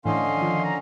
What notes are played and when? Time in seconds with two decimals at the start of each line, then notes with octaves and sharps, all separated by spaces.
0.05 A2 D3 E3 C#4 D#5 F5 C6
0.37 D#3 F3
0.64 A#5